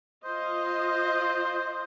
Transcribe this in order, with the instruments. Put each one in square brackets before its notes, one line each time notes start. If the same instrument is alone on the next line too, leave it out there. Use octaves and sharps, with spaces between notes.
[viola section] F4 D#5 [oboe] C5